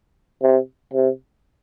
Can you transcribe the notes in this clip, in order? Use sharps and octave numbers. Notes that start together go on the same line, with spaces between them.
C3
C3